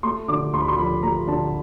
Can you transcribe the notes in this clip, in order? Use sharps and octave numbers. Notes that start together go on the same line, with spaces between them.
A3 C6
D3 D6
D2 C6
B5
C6
F3 B5
A3 A#5
D3 A5